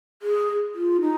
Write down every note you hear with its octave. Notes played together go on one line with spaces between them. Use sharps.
G#4
F4
D#4